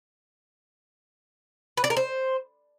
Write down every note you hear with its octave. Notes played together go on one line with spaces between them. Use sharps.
B4
D5
A#4
C5